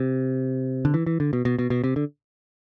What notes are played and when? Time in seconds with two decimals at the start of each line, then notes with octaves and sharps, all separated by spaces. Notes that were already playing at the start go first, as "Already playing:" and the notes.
Already playing: C3
0.85 D3
0.94 E3
1.06 E3
1.20 D3
1.33 B2
1.45 B2
1.59 B2
1.70 B2
1.84 C3
1.96 D3